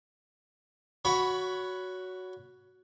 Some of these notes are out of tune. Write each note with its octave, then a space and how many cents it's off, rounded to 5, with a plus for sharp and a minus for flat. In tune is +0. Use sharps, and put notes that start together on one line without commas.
F#4 +0 C#5 +20 B5 +0